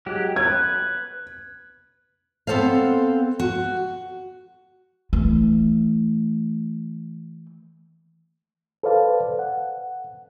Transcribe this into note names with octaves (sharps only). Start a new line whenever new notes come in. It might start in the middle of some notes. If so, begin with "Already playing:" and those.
F#3 G#3 G4
B4 G#6
B3 C4 A4 C5 F5
F#4
E3 A3
A4 B4 C5 D5 F5 A5
F#5